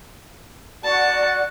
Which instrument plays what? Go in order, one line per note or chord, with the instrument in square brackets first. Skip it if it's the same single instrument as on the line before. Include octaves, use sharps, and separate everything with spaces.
[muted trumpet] F#4 [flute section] D5 F#5 [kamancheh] A5